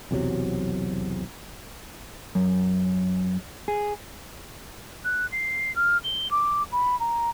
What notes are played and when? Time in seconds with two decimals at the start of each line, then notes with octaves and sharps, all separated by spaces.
0.11 B1 E2 C3 F#3
2.35 F#2
3.68 G#4
5.05 F#6
5.32 C7
5.76 F6
6.04 G7
6.31 D6
6.72 B5
7.00 A#5